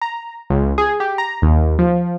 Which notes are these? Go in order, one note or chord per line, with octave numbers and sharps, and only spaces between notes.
A#5
C#2
G#4
G4
A#5
D#2
F3